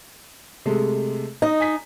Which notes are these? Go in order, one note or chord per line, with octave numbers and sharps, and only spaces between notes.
C3 G#3 A3
D#4 D#5
G#5 B6